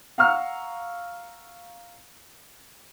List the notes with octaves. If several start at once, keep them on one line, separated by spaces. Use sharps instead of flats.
F5 F#5 A#5 C#6 E6 F6